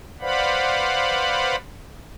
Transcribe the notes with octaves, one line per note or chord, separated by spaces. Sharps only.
B4 C5 D5 F5 F#5 B5